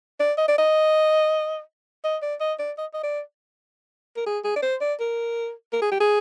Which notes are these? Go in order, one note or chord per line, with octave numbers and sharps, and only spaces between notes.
D5
D#5
D5
D#5
D#5
D5
D#5
D5
D#5
D#5
D5
A#4
G#4
G#4
D5
C5
D5
A#4
A#4
G#4
G4
G#4